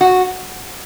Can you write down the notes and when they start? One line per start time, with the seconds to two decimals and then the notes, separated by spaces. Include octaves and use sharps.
0.01 F#4